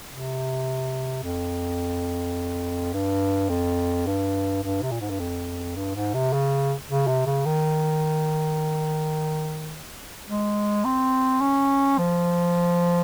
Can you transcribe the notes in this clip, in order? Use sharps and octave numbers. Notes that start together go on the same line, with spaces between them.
C3
F2
G2
F2
G2
G2
C3
A#2
G#2
G2
F2
G2
G#2
C3
C#3
C#3
C3
C#3
D#3
G#3
C4
C#4
F3